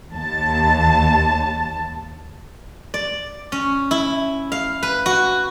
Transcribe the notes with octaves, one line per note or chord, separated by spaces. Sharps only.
D#2 A5
D5
C#4
E4
F5
B4
F#4